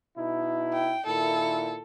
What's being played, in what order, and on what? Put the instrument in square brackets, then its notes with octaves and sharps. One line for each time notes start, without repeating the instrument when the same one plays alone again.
[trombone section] B2 D#4 E4
[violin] G5
[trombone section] A#2 D#3 E4 [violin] A4